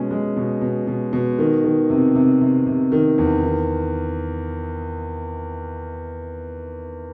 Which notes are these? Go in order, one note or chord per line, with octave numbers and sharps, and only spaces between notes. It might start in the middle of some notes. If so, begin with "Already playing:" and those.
Already playing: B2 G#3 C#4
G#3
B2
B2
B2
B2
D#3
D#3
C3
C3
C3
C3
D#3
E2
D#3